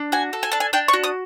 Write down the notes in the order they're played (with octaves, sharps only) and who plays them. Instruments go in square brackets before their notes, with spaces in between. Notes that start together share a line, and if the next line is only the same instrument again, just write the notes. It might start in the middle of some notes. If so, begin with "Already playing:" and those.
Already playing: [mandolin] D4
F#4 G#5
A4
G#5
D4 A5
G#5
D4 G5
C#6
F#4
D#6